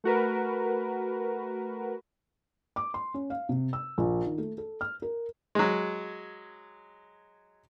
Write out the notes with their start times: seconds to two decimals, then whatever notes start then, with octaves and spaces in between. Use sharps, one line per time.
0.04 A3 F#4 A#4 B4
2.76 D6
2.94 C6
3.14 C#4
3.30 F5
3.49 C3
3.73 E6
3.98 A#1
4.25 D#3
4.38 A3
4.58 A4
4.81 F6
5.02 A#4
5.55 F#3 G#3